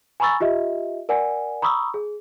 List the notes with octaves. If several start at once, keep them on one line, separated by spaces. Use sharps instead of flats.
G#5 A#5 B5 C#6 E6 A6
F4 G4 D#5 E5
A#4 D5 F#5 G#5
A#5 B5 C#6 D#6 E6
G#4